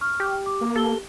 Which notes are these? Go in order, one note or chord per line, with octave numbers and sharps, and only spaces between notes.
C#6 F6
G4
D6
A#3
G4 A4 G7